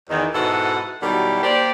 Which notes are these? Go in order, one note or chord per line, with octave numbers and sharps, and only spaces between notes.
E2 D#3
G#2 B2 E4 A4 D#5 F#5
B2 D#3 F#3 G3 E4 G4
A#3 G4 C5 D5